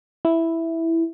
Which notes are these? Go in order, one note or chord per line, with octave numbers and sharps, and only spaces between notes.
E4